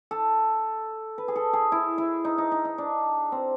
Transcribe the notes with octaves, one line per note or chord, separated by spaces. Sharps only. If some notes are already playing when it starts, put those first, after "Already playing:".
A4
B4
G#4
A4
G#4
E4
E4
D#4
D#4
D#4
D#4
D4
C4